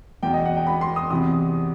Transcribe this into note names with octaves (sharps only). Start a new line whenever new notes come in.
E2 B2 G5
D#5
F#5
G5
B5
C6
D#6
E2 C3 E3 D#6